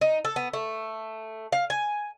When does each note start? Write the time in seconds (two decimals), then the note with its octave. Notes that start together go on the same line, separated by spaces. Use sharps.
0.01 D#4
0.25 A4
0.36 B3
0.53 A3
1.52 F5
1.70 G#5